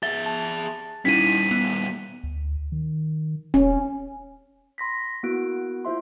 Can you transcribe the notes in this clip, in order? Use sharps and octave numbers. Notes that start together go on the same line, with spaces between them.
G#4 E5 A6 G7
A5
A#2 G3 C#4 D#4 E4 B6 D#7
B3
D2
D#3
D#1 C#4
B5 C6 A#6 B6
A#3 B3 E4 F#4 F#6 D7
E4 F4 C5 E5 C6